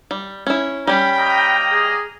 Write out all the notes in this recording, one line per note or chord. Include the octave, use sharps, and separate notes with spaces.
G3
C#4 E4
G3 C#4 G5 B5
A#3 D#5 A#5
G#4